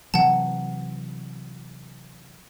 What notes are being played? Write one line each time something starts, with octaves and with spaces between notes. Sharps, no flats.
C3 E3 F#3 F#5 A5